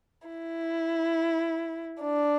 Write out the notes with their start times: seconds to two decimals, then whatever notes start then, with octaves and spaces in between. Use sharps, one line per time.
0.27 E4
2.02 D4